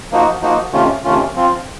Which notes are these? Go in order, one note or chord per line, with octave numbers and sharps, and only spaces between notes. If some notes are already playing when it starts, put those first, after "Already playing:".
F3 A#3 D#4 F#4
F3 A#3 D#4 F#4
C3 D#3 A3 C#4 F4
C3 D#3 A3 C#4 F4
F3 C4 F4